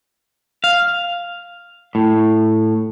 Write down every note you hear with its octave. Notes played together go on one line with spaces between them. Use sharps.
F5
A2